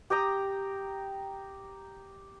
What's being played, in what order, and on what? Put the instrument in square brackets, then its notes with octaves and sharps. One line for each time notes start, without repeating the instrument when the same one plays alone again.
[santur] G4 G5 A#5 D#6